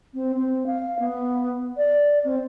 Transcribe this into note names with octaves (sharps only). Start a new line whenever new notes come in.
C4
C4
F5
B3
D5
C4